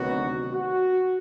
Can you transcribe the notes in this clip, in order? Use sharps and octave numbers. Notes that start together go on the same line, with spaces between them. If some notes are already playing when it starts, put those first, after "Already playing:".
Already playing: D2 C3 D#3 F#3 B3 F#4
F#4